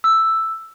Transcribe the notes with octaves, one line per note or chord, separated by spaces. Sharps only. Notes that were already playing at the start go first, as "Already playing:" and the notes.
E6